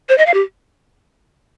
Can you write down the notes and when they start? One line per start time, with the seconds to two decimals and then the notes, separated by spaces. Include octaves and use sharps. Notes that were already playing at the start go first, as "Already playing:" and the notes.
0.09 C5
0.18 D#5
0.26 F5
0.34 G4